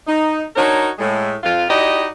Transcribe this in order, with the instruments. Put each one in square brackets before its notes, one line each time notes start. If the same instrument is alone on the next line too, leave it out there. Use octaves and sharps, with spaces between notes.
[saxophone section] D#4
D4 D#4 F#4 A#4 C#5
A2 G#3
F2 F4
D#4 E4 F#4 G4 D5 D#5